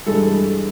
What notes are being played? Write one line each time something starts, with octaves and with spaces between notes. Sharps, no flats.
G2 E3 G#3 A4